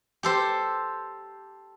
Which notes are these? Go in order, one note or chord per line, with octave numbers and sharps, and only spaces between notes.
G4 A4 C5